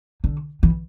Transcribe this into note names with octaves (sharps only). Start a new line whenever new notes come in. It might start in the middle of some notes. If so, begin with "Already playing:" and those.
D3
E3